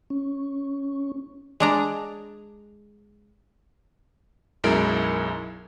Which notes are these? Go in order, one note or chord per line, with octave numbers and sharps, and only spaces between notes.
C#4
G#3 D4 A#5
B1 F#2 G#3 E4 A#4 D7